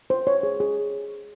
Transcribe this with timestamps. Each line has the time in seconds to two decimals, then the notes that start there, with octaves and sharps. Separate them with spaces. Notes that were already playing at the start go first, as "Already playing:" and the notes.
0.10 C5
0.27 C#5
0.43 G#4
0.60 G#4